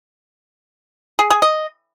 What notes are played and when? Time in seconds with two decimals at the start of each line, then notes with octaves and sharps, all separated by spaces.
1.19 G#4
1.30 G#4
1.42 D#5